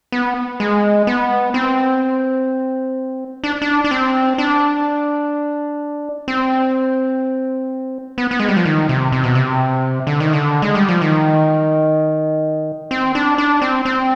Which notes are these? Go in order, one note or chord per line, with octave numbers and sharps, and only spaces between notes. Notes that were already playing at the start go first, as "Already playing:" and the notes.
B3
G#3
B3
C4
D4
D4
D4
C4
D4
C4
B3
B3
G#3
G3
F3
D#3
C3
C3
B2
C3
D3
D#3
D3
G#3
G3
F3
D#3
C4
D4
D4
C4
C4